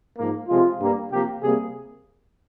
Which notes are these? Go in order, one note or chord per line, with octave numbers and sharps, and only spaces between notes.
G#2 F3 A#3
C3 F3 G#3 F4
G2 G3 A#3
C3 F3 A#3 G4
C3 G3 A#3 G#4